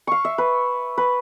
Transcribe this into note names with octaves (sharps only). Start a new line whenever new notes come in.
F5 C#6
E5
B4
B4